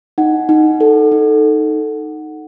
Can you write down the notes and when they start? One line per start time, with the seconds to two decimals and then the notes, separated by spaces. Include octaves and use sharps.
0.18 D#4 F#5
0.49 D#4
0.81 A4
1.12 D#4